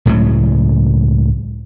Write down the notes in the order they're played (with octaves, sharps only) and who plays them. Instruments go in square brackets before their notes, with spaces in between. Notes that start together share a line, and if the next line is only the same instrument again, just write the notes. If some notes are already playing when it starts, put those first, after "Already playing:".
[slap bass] C#2 A2 C#3 F#3